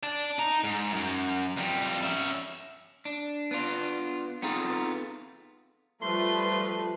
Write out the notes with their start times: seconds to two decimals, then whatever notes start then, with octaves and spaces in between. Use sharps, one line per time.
0.03 D5 A5
0.39 D#4 A#5
0.64 G#2
0.93 F#2
1.57 F2 G3
2.03 C#4 E5
3.05 D4
3.51 B3 D4 F4
4.42 B3 C4 D#4 F4 G#4 A4
6.02 F3 G3 A3 B4 C6